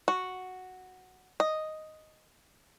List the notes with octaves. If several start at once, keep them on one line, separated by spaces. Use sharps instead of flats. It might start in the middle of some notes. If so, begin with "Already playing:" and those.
F#4
D#5